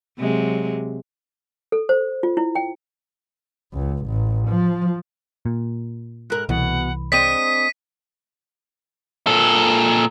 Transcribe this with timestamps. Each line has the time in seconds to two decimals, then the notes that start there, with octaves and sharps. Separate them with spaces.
0.19 C3 F#3 G#3
1.72 A4
1.89 C5
2.23 F4
2.37 E4
2.55 G5
3.74 C#2
4.06 A1
4.49 F3
5.46 A#2
6.30 G#2 A#4 F#6
6.49 C2 B2 E3 F#5
7.12 G#3 C4 D4 D#6 B6 D#7
9.27 A#2 A4